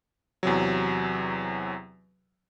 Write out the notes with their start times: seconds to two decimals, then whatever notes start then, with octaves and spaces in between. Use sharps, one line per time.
0.43 E2 C3 F#3